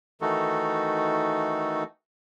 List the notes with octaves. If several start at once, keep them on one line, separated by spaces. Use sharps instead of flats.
D#3 E3 A3 D#4 F#4 A4